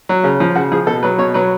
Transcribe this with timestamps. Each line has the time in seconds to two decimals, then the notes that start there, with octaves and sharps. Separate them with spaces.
0.09 F#3
0.24 C#3
0.40 F3
0.55 C#3 F#4
0.72 F3 G#4
0.87 B2 A4
1.03 F#3 B4
1.18 B2 C#5
1.34 F#3 B4